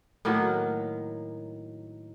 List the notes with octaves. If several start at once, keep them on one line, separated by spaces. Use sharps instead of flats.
A2 D#3 F#3 A#3